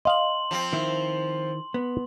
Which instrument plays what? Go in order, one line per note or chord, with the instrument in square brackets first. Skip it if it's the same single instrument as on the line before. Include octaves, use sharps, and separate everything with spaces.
[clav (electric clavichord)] D#5 F5 [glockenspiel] C6 F#7
[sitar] F3 C4
[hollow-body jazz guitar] D#3 E4
B3